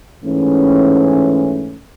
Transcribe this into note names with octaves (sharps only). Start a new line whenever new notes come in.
G#2 E3 A3 C#4